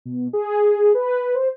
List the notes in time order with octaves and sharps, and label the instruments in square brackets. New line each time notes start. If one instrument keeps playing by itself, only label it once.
[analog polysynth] B2
G#4
B4
C5